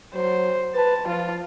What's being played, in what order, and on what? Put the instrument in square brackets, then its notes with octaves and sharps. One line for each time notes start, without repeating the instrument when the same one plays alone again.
[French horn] F#3 [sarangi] C5
[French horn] B4 [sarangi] A5
[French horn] F3 [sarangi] F4